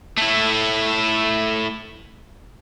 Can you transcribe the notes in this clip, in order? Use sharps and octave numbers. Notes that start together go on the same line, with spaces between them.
A3 E4